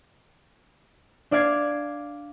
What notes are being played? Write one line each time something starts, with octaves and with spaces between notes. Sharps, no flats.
D4 D5 F5 G#6 C7